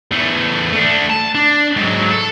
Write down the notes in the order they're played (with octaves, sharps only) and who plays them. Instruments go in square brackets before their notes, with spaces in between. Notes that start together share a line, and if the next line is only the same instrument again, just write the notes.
[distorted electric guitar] E2 A3
A3 D4
A5
D4
G#2 F#3
A4